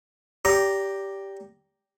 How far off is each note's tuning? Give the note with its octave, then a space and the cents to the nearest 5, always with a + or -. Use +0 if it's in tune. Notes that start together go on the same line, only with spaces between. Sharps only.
G4 +0 D5 -30 A#5 +0